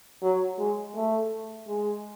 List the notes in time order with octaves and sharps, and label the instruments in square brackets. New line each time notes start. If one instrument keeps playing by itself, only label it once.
[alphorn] F#3
G#3
A3
G#3